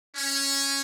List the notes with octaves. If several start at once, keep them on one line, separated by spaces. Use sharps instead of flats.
C#4